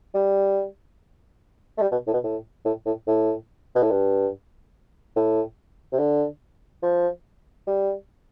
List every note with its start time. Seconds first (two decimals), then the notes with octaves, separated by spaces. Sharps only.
0.14 G3
1.78 A3
1.82 G3
1.92 B2
2.08 A2
2.14 B2
2.24 A2
2.66 A2
2.86 A2
3.08 A2
3.75 B2
3.83 A2
3.91 G2
5.16 A2
5.93 C3
5.99 D3
6.83 F3
7.67 G3